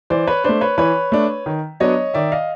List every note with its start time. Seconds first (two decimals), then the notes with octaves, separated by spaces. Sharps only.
0.10 E3 C5 D5
0.27 B4 C#5
0.44 A3 D4 C5
0.61 B4 C#5
0.78 E3 B4 C#5
1.12 A3 D4
1.46 D#3
1.80 F#3 B3 D4 C#5 D#5
2.14 D#3 D5 E5
2.32 D#5 F5